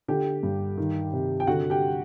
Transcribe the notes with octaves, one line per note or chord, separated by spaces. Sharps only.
D3 G4 G5
G2
D#3
C3
G5
D3 F#4 F#5
G4 G5